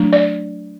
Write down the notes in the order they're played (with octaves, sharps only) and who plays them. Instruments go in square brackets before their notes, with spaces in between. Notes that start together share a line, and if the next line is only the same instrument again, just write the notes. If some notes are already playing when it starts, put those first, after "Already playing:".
Already playing: [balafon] F#3 A3 D4
D5